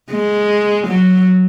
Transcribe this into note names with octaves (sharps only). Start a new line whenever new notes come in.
G#3
F#3